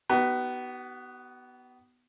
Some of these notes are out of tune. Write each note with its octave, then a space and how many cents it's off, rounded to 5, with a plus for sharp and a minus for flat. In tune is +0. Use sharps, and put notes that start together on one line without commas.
B3 +0 D#4 +0 F#4 +45